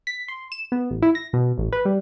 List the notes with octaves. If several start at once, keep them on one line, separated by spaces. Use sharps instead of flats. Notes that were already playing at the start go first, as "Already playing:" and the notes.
B6
C6
E7
B3
A1
E4
A#6
B2
A1
B4
G3